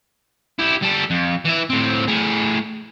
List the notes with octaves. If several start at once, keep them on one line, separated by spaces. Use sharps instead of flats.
E4 G4
G3 A4
F2
E3 E5
A2 C4
A2 G#4